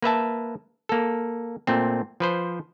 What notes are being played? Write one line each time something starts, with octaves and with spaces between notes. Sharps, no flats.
A#3 B4 E5 A5
A#3 A4
A#2 A3 C4
F3 B4 C5